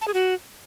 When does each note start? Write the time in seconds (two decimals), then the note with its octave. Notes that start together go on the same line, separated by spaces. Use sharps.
0.01 A5
0.08 G#4
0.14 F#4